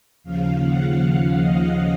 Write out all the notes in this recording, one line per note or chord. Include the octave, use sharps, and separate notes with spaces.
D#2 C#3 F3 F5
F#5
D#5